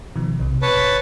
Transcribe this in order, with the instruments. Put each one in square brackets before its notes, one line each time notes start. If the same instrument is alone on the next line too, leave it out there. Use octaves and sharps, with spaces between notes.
[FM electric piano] B2 D#3 F3
B1 C3
[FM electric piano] B2 [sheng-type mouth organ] B4 C#5 A5
[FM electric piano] G1